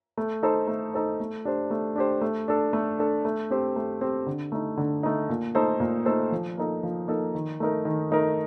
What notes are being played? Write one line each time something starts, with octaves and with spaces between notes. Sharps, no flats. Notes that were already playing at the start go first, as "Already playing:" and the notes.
A3
D#4 A4 C5
A3
D#4 A4 C5
A3
D4 G4 C5
A3
D4 G4 C5
A3
D4 A4
A3
D4 A4
A3
C4 G4 C5
A3
C4 G4 C5
D3
A3 D#4
D3
A3 D#4
A#2
A3 D#4 A4 C5
A#2
A3 D#4 A4 C5
F3
A#3 D#4 A4
F3
A#3 D#4 A4
D#3
A3 D#4 A#4
D#3
A3 D#4 A#4